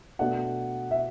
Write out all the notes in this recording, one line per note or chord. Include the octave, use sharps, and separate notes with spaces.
B2 A3 D4 F#5
E5